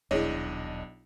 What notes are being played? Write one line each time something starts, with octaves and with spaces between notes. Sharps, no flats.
D#1 B1 D4 E4 G#4 C#5 D#5